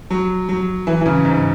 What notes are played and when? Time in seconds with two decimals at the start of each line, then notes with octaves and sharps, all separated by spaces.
0.10 F#3
0.49 F#3
0.87 E3
1.01 E3
1.06 C#3
1.25 G#2